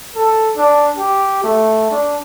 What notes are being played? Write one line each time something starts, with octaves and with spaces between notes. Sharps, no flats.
A4
D4
G4
A3
D4